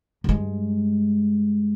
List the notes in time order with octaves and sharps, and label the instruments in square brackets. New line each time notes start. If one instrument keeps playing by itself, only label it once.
[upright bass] G2 G#3